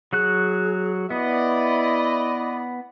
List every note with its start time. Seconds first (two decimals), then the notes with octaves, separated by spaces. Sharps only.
0.13 F#3 F#4 G#4 F#6
1.10 B3 E4 D5 D#5 B5